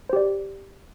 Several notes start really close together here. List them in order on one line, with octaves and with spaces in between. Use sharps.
C5 G4 D5